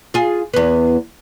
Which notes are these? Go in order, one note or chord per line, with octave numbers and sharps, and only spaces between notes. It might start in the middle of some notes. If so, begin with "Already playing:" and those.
F4 G#4
E2 B3